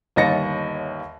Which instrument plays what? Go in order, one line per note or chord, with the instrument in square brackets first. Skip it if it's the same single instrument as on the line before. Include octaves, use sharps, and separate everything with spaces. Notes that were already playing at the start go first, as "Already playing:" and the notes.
[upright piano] G1 D#2 D#5 A6 A#6 C#7